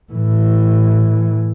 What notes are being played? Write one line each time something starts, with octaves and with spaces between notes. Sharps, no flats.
A2 E3